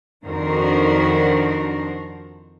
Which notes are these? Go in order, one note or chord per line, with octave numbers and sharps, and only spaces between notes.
F2 D#3 D4 F#4 A#4 C5